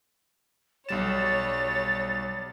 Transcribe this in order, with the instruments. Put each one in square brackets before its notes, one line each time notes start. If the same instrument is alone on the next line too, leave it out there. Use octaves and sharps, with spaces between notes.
[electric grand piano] B1 G3 E7 [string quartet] C#5 [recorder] A6